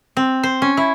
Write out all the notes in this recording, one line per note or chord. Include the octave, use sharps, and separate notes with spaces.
C4
C5
C#4
E4